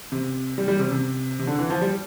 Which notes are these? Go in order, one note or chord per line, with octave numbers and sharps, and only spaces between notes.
C3
G3
G3
C3
C3
C3
D3
E3
F3
G3